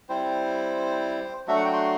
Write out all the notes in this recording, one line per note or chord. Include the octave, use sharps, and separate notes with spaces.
G3 C4 E4 C5
F#3 A3 D4 F#4 E5
F#5
G5
C6